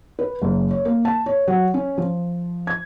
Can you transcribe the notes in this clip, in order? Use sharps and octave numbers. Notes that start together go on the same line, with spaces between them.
B4
F#1
C#5
A#3
A5
C#5
F#3
C#4
F3
G#6